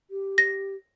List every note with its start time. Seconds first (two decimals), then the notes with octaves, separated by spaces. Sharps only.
0.11 G4
0.38 A#6